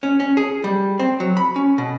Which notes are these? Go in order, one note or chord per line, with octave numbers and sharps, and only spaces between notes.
C#4
C#4
G#4
G3
C4
F#3
B5
C#4
B2